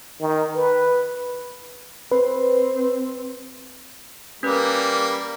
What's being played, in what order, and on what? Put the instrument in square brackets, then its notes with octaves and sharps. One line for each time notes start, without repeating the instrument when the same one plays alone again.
[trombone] D#3
B4
[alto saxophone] C4 [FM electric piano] B4
[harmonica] G3 A#3 [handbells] C#4 B4